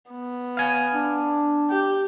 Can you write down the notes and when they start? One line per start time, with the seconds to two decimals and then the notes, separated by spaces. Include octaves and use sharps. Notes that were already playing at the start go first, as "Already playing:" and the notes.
0.11 B3
0.57 F5 G#5
0.94 D4
1.70 G4